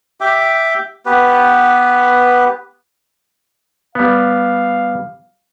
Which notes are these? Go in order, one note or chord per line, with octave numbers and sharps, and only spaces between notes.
G4 E5 G5 D6
B3 G4 B4
G3 B3 F5